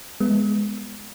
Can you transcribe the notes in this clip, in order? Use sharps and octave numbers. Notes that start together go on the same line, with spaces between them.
G#3 B3